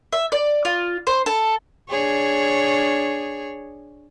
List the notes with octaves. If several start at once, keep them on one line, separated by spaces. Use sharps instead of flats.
E5
D5
F4
C5
A4
D4 G#4 C#5